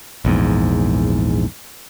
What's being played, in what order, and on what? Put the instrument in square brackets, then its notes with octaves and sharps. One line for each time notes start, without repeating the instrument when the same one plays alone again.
[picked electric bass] A#1 E2 G#2